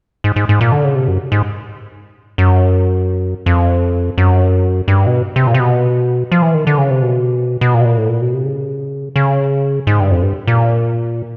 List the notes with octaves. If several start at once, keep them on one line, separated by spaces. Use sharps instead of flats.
G#2
G#2
G#2
A#2
D3
C#3
C3
F#2
G#2
F#2
F2
F#2
G2
B2
C3
A#2
C3
B2
F3
E3
D#3
D3
C#3
C3
B2
B2
A#2
B2
A#2
A2
A#2
B2
C3
C#3
C#3
G#2
G2
F2
G2
A#2